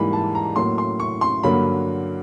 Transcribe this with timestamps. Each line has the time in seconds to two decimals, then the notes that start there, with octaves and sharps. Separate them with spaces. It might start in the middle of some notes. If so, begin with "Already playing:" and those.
Already playing: G#2 E3 G3 A#3 B5
0.13 A5
0.35 A#5
0.56 A2 F#3 A#3 C6
0.78 C6
1.00 C#6
1.21 C6
1.43 G2 D3 F#3 A#3 B5